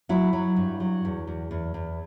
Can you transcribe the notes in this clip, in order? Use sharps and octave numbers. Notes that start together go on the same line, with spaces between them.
F#3 E4
F#3
G2
F#3
E2
E2
E2
E2